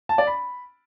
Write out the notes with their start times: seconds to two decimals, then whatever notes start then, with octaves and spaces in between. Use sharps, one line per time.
0.09 A5
0.18 D5
0.27 B5